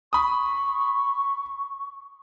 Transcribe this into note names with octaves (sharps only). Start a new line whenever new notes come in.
B5 C#6 D#6